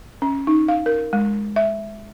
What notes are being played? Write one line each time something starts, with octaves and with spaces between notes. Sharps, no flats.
C#4
D#4
F5
A#4
G#3
E5